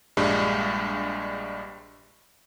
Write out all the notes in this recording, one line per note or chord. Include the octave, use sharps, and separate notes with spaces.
A#1 G2 G3 G#3